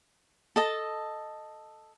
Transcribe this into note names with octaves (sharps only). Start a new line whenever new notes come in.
A4 D#5 A5